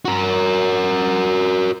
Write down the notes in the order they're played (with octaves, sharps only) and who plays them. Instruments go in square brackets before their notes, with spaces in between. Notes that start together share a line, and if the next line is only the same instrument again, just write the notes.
[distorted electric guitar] F#4 A#4